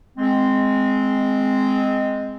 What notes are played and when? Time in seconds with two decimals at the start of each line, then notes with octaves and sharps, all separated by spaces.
0.18 G#3 C4